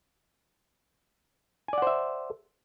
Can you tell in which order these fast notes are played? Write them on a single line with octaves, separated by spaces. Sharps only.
G#5 D5 F#5 C5 E5